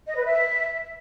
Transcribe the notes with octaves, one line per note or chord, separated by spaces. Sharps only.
D#5
B4
E5